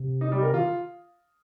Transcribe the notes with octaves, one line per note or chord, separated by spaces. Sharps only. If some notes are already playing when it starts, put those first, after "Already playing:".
Already playing: C3
D#4
G3
A#4
D#3 F4